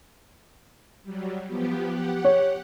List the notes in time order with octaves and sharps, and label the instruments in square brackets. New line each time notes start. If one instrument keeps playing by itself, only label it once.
[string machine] F#3 G3
F3 B3 G4
G4 F#5
[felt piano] C#5